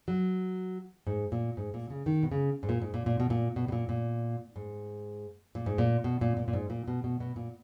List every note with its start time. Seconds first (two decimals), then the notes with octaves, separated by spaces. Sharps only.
0.08 F#3
1.07 G#2
1.32 A#2
1.57 G#2
1.74 A#2
1.90 C#3
2.06 D#3
2.23 B2
2.31 C#3
2.63 G#2
2.69 A#2
2.82 G#2
2.94 A#2
3.06 A#2
3.20 B2
3.30 A#2
3.56 B2
3.68 B2
3.72 A#2
3.89 A#2
4.56 G#2
5.55 A#2
5.66 G#2
5.78 A#2
6.04 B2
6.21 A#2
6.37 A#2
6.48 A#2
6.53 G#2
6.70 A#2
6.88 B2
7.04 B2
7.20 B2
7.36 A#2